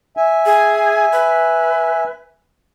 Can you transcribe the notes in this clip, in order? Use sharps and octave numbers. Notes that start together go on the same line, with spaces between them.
E5 G#5
G#4
B4